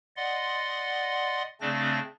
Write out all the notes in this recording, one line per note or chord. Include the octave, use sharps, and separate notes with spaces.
D5 D#5 F#5 C6
C#3 A3 C4 D4 D5 A#6